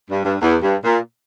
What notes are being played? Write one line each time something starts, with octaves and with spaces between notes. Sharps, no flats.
G2
G2
E2
G2
A#2